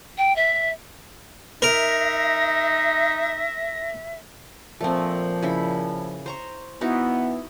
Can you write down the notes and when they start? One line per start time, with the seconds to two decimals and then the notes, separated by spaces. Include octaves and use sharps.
0.18 G5
0.36 E5
1.62 D#4 A#4 E5 A#6
4.81 A#2 F3 A3 C4
5.43 C#3 E4 B5
6.26 C5 A#5 C#6
6.81 E3 B3 D#4 E4 F#4